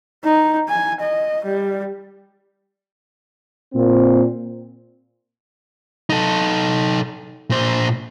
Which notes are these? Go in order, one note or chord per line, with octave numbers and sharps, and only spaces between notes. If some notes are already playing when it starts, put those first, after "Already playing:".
D#4
G#5
D#5
G3
A#2 C4
D#4 A4
A#2 C5